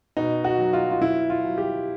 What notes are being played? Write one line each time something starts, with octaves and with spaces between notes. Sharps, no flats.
B2 D#4
F#4
F#3
F4
F4
F#3 E4
F4
F#3
G4